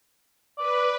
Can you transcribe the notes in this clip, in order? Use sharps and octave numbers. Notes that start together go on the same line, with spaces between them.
B4 D5